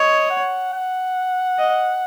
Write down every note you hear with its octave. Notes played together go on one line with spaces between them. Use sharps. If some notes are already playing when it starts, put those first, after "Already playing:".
Already playing: C#5 D#5
F#5
F#5
D#5